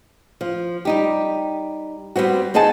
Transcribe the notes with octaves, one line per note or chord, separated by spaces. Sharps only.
F3
G3 D#4 G4
G3 B3 C4 F#4
C4 D#4 G#4 D#5 F#5 A5